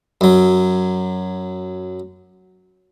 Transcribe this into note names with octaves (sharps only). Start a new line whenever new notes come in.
F#2 F#3